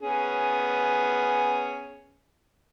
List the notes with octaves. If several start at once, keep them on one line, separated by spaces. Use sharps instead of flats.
B3 C#4 G#4